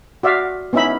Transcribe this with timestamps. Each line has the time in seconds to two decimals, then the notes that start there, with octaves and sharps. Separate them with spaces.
0.23 F#4 D5 E5 F5
0.73 B3 C#4 D#4 E4 E5 B5